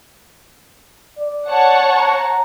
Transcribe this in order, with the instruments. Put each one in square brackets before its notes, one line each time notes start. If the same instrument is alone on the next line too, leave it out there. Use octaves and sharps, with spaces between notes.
[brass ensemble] D5
[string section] C#5 F#5 A5
[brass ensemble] A#5